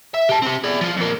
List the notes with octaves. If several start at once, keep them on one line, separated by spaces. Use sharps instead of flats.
E5
G4 A5
C4 G4
G#4 D5
F3 F4
F2 A#3